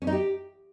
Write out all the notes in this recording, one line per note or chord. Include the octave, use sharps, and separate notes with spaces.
C#4
D#4
G4